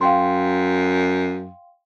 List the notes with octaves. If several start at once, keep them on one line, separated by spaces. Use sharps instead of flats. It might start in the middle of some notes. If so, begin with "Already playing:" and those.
F#2 F5 G5 C6